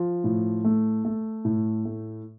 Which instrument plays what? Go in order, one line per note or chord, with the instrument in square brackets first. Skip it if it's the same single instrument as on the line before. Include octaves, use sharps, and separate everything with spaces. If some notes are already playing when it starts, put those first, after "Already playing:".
Already playing: [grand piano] F3
A2
A3
A3
A2
A3